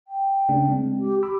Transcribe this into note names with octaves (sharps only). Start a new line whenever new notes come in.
G5
C#3 A3 D4
G#3 C4
G4
G4 B5 D6 E6